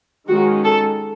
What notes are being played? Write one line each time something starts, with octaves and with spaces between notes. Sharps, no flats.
D#3 G#3 C#4 F#4
A4